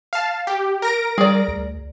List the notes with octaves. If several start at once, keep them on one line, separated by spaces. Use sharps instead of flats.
F5 A5
G4
A#4 A#6 D7
G3 G#4 D5
D2